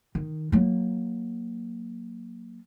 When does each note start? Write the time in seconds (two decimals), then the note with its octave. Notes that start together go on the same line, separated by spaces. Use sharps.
0.15 D#3
0.52 F#3 A#3